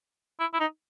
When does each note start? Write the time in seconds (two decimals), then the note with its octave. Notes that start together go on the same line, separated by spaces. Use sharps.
0.40 E4
0.54 E4
0.60 D#4